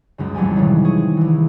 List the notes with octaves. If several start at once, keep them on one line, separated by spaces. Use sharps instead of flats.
C#2 F#2 C#3
A1 F2 F#3 G3 G4 G#5
C3 D#3 E3 F#3 C4
G#4 C#6
C2 E3